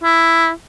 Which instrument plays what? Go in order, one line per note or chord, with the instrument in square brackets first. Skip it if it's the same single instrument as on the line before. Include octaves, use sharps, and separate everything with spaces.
[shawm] E4